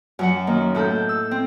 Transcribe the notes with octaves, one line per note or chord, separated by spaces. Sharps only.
F#2 F#3 F#5
D#3 A#3
A2 E4 A4 G6
E6
C4